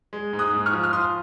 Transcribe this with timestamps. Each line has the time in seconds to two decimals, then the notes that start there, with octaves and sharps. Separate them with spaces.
0.13 G#3
0.33 G#2
0.39 D#6 F#6
0.53 G#2
0.66 C#6 F6
0.73 F3
0.84 F6
0.93 F3 C6 D#6